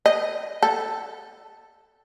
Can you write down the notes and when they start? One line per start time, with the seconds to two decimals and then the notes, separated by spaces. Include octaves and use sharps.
0.06 D#5
0.63 A4